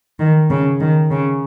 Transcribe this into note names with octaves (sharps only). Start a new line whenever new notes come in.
D#3
C#3
D#3
C#3